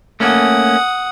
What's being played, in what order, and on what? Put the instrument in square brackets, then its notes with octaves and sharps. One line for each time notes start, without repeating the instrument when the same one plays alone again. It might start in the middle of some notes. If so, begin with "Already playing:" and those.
[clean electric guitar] A3 A#3 C#4 [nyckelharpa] F#5 D#6